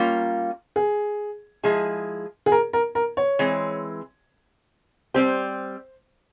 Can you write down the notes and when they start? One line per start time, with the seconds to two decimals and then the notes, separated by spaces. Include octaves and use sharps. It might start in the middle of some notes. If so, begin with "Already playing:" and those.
Already playing: G3 A#3 C#4 F4
0.76 G#4
1.63 F3 G#3 E4 G#4
2.46 G#4
2.52 A#4
2.73 A#4
2.95 A#4
3.17 C#5
3.39 E3 G#3 C4
5.14 G3 C4 G4 C5